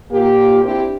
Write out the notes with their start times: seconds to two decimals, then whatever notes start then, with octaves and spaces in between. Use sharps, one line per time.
0.12 A#2 A#3 G4
0.64 C4 D4 E4 G4